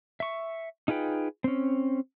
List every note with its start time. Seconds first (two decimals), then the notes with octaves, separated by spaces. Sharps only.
0.20 E5 C#6
0.88 D#4 F4 G#4 B4 G5
1.44 C4 C#4